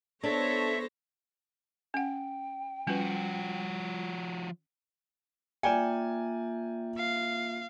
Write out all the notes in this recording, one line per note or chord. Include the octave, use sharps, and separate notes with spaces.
B3 D4 A4 C5 C#5 E5 A#6
C#4 F#5 G5
F3 G3 C#4 F4 F#4 B4
A#3 F4 D5 E5 G5 G#5
F5